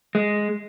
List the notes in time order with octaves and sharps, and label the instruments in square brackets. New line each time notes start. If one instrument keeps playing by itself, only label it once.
[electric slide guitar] G#3